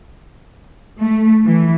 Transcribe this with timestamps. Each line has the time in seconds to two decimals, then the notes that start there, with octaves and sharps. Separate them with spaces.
1.00 A3
1.45 E3